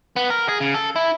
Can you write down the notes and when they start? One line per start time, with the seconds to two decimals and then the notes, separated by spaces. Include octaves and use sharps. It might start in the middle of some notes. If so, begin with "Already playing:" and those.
0.16 B3
0.30 A#4
0.49 G#4
0.60 C#3
0.74 A4
0.96 E4